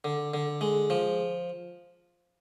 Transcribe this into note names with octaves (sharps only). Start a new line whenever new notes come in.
D3
D3
G#3
F3